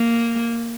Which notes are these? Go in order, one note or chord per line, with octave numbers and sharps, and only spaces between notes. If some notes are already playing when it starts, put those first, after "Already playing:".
Already playing: A#3